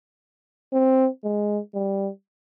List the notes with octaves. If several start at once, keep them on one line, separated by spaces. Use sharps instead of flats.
C4
G#3
G3